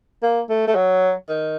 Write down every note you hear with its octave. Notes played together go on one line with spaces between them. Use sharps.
A#3
A3
A3
F#3
D#3